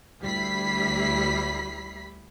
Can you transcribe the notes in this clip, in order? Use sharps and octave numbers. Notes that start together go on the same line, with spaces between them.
D2 G3 E4 B5 B6 C7